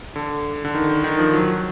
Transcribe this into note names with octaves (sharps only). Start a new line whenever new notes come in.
D3
D3
D#3
D#3
D#3
F3
F#3